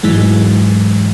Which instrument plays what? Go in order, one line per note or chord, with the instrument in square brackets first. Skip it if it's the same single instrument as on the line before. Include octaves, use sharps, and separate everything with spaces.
[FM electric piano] G#2 E3 F#3 G#3